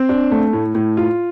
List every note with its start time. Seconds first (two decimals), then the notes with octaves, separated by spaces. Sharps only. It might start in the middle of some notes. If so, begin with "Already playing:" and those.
Already playing: C4
0.09 D4
0.31 A3
0.53 A2
0.75 A2
0.97 F4